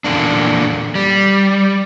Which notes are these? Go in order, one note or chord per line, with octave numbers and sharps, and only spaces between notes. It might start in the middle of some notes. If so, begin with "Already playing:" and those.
E2 A#2 D3 A#3 D4
G3